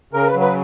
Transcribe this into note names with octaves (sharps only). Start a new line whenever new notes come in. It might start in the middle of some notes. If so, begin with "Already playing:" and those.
C#3 A#4
B4
F#3
B4